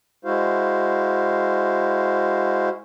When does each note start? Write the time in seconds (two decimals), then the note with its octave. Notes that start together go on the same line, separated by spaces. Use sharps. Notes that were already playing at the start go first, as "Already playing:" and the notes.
0.25 G#3 E4 F#4 C5 F5